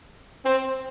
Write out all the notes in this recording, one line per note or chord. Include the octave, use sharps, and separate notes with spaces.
C4